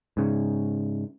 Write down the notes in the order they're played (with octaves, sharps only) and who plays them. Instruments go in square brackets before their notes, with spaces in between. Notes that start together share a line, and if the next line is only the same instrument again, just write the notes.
[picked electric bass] G#2 C#3